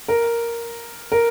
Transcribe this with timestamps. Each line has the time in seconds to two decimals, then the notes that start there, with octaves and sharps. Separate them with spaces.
0.08 A#4
1.12 A#4